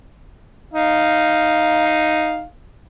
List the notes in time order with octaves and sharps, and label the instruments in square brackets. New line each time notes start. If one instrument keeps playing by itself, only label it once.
[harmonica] D#4 F5